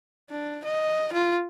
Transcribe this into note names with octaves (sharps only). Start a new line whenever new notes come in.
D4
D#5
F4